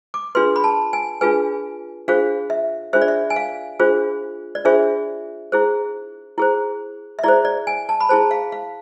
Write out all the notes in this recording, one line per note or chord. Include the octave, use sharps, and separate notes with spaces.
D6
D4 F4 G#4 B4 C6
B5
A5
G#5
D4 F4 G#4 B4 G#5
D4 F4 G#4 C5 F5
E5
D4 F4 G#4 C5 E5
D5
E5
G#5
F5
D4 F4 G#4 C5
D5
D4 F4 G#4 C5 E5
E4 G#4 C5
E4 G#4 C5
E5
E4 G#4 C5 D5
D5
G#5
A5
B5
E4 G#4 C5 A5
F5
F5